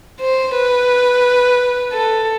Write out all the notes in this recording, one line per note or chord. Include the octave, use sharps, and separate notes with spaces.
C5
B4
A4